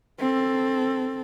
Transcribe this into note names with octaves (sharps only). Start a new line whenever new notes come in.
C4 A4